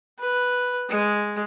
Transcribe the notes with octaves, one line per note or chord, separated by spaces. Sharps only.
B4
G#3